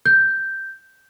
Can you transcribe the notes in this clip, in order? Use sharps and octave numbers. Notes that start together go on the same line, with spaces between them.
G6